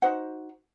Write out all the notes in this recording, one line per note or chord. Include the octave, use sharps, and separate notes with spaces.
D#4 F#4 C5 F#5